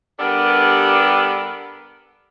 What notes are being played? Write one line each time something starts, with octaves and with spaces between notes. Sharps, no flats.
G2 B3 D4 G4 A4 A#4